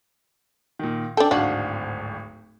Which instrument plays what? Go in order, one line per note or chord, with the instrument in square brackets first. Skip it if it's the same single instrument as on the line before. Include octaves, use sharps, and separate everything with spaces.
[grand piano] A#2 D#3
[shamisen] D4 A4 [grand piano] G5
[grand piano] D1 G#1 F5 [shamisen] D4 F#4